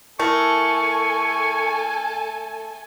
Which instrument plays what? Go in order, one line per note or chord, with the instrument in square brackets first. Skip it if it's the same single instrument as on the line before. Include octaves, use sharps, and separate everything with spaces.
[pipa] A3 [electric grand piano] E4 A#4 E5 [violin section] A4 G#5 [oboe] C#6